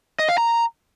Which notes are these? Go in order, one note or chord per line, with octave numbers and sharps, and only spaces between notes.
D#5
F5
A#5